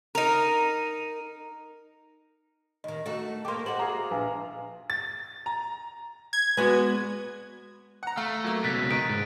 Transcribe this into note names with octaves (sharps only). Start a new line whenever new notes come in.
D#4 A#4
D#2 D#3 D#5
A3 D#4 F#4
A3 A#3 G5 C6 D6
F#4 A4 C5 D#5 F#5 F#7
G#4 F5 A#5 D6
A#1 B4 F5 G#5
A6
A#5
G#6
G#3 B3 F#4 B4 D5
F#5 A#5
A3 F5
F#3 A#3
C#2 B2 F#6 A6 B6
D#3 D#4 D7 D#7
G#2